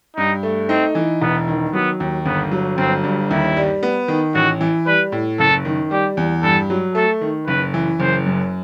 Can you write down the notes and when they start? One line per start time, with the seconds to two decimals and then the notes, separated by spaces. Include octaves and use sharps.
0.17 G2 D#4
0.43 A3
0.69 C4 D#4
0.95 E3
1.22 E1 B3
1.48 D#3
1.73 F#3 B3
2.00 D#2
2.26 G1 B3
2.51 F#3
2.78 G1 C4
3.04 G2
3.31 D#2 E4
3.57 G3
3.83 B3
4.08 D#3
4.34 A1 F#4
4.61 E3
4.86 G3 B4
5.12 A2
5.39 F#1 A4
5.65 D#3
5.91 G3 G4
6.17 E2
6.43 G2 A4
6.70 F#3
6.95 A3 A4
7.21 D#3
7.47 F#1 B4
7.74 E3
8.00 F#1 C5
8.26 F#2